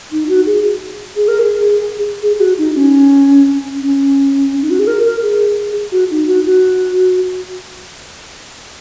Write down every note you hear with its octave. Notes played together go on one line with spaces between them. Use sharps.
D#4
F#4
G#4
G#4
A#4
G#4
G#4
G#4
F#4
D#4
C#4
C#4
D#4
F#4
G#4
A#4
A#4
G#4
F#4
D#4
F#4
F#4